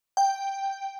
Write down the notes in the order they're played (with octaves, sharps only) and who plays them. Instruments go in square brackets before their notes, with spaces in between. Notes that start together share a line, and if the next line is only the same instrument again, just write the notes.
[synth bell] G5